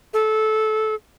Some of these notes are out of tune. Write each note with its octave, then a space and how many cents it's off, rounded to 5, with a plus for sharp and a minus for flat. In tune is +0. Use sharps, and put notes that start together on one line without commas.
A4 -20